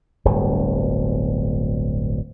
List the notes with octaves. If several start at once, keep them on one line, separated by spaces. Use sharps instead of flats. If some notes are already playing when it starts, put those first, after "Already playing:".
D1 G1 G2